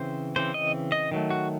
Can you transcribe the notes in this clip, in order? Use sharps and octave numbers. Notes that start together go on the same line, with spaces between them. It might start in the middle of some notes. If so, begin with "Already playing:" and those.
Already playing: C#3 E3 C4 C5
C#3 E3 C4 C5
D#5
D#5
D#3 F#3 A3
F#4